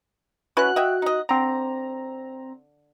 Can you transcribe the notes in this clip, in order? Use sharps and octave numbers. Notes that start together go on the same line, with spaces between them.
C#4 E4 F#4 B4 F#6
D#5 E5 G5
D#4 D#5
D3 C4 A#5